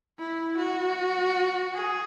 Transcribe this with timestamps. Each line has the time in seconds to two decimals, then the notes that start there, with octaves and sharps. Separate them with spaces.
0.19 E4
0.58 F#4
1.74 G#4